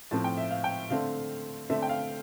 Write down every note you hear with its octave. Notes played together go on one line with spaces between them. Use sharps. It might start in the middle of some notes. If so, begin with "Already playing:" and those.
A2 F3 C4 A5
G5
E5
F5
G5
D3 A3 C4 F5
D3 A3 C4 E5
G5
F5